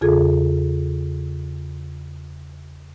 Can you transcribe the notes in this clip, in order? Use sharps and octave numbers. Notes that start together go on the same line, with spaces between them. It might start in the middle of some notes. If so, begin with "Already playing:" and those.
E2 C#3 F4 G#4 A4 G#6